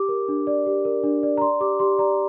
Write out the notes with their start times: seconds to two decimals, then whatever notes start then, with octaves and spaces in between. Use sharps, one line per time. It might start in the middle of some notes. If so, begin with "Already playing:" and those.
Already playing: G4 D6
0.09 A#4
0.28 D4
0.47 D5
0.66 G4
0.85 A#4
1.03 D4
1.23 D5
1.38 A#5
1.41 D5 C6
1.61 G4 D6
1.79 G4 C6
1.98 D5 A#5